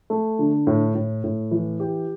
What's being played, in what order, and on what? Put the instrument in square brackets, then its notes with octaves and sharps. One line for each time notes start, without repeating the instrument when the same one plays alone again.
[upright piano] A3
D3
A2
A2
A2
E3
G4